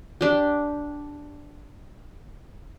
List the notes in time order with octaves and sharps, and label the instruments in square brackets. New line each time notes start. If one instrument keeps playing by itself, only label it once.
[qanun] D4 G4